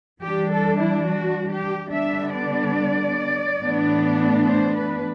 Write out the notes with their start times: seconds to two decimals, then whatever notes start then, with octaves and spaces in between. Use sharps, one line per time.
0.22 E3 G3 D4 G4
0.51 A4
0.78 E4
1.07 F#4
1.50 G4
1.92 D3 G3 B3 D4 E5
2.34 D5
3.62 A2 E3 B3 D4
4.47 C5
4.76 B4